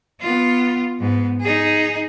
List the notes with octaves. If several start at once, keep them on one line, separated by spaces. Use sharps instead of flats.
B3 F4
G#2 B3
D#4 G#4